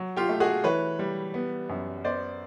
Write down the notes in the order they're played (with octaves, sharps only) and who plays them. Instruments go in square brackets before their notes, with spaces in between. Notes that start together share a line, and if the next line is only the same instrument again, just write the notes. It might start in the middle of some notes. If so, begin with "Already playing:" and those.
Already playing: [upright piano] F#3
F4 G4
A3
F#4 G#4
E3 B4 C#5
G3
B3
F#2
B3 C5 D5